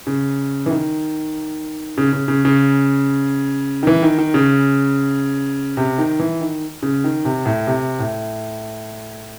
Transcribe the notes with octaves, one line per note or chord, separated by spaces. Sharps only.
C#3
E3
D#3
C#3
C#3
C#3
C#3
D#3
E3
D#3
D#3
C#3
C3
D#3
E3
D#3
C#3
D#3
C3
A2
C3
A2